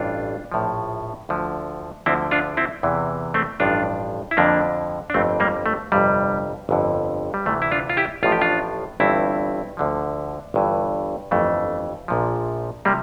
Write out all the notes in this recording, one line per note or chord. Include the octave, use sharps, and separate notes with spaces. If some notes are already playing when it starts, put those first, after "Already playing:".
Already playing: A1 G2 E3 D4 F4
A#1 A2 F3
D2 D3 F3
D2 D3 F3 C4 E4
D4 F4
C4 E4
E2 C3 E3
A3 C4
A1 G2 F3 D4 F4
E4
F2 D3 F3 A#3 D4
D4
G1 F2 D3 A3 C4
G3 A#3
A3
G1 F2 C3 G3
G1 F2 D3
G3
D2 C3 E3 A3
E4
D4 F4
F4
E4 G4
A1 A2 F3 F4
G4
D4 F4
G1 G2 E3 C4 E4
D2 D3 F3
G1 G2 E3
G1 F2 E3 A3
A#1 A#2 F3
C3 F3 G3 A#3